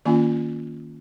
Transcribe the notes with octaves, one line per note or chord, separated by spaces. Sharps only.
D#3 A#3 C#4 F4 G#5